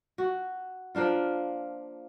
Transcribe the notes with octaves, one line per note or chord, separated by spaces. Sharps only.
F#4
F3 A#3 D4 F4